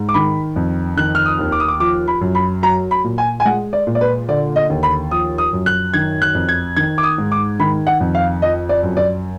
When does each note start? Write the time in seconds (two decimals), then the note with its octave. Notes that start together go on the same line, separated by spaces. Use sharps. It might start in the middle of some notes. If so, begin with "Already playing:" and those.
Already playing: G#2
0.09 D6
0.14 D#3 B5
0.56 F2
0.97 D#3 F#6
1.15 F6
1.26 D#6
1.39 D#2
1.52 D6
1.60 D#6
1.68 D6
1.80 F3 D6
2.08 B5
2.21 F#2
2.35 B5
2.63 F#3 A#5
2.91 B5
3.04 A#2
3.18 G#5
3.40 G#5
3.45 G#3 F#5
3.73 D5
3.87 A#2
3.95 D5
4.01 B4
4.28 D3 D5
4.56 D#5
4.70 D#2
4.83 B5
5.11 F3 D#6
5.38 D#6
5.53 F#2
5.66 F#6
5.94 D#3 G#6
6.22 F#6
6.35 F2
6.49 G#6
6.76 D#3 G#6
6.98 D6
7.03 D#6
7.18 G#2
7.32 D6
7.59 D#3 B5
7.87 F#5
8.01 F2
8.15 F5
8.42 F3 D#5
8.69 D5
8.83 F#2
8.97 D5